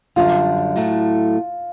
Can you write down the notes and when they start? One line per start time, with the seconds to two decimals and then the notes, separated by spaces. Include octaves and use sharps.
0.16 F#2 D3 G3 F4
0.76 A2 F#3 A3